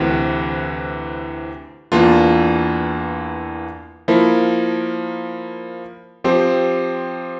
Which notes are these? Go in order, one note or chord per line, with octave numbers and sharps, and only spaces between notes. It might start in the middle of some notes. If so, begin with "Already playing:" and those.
Already playing: D2 C3 E3
E2 E3 A#3 D4 F4
F3 A#3 E4 A#4
F3 C4 G4 C5